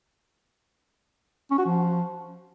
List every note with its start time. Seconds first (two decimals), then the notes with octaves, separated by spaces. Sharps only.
1.51 C#4
1.58 F#4
1.66 F3